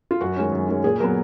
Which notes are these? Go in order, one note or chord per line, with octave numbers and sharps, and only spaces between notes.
F4
F#2 F#4
D#3 G#3 C#4
F#2
D#3 G#3 C#4
A#2 G#4
F#3 B3 A#4